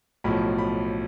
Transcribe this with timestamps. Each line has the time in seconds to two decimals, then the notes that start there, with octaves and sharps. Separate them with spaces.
0.24 B1 A2 F3 B5
0.58 B5